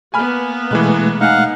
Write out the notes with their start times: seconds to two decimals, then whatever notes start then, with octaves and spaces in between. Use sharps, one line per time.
0.14 A#3 B3 G#5 B5 F6
0.71 B2 E3 G#3 A3 F#6
1.21 D#4 F5 F#5 G#5